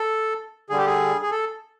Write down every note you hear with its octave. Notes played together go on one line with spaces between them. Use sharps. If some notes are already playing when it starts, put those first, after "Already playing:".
Already playing: A4
D3 G3 G#4
G4
G#4
G#4
A4